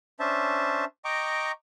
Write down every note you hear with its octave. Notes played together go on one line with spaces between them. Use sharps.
C#4 D4 C5 E5 A5
D#5 G5 A#5 C#6 D6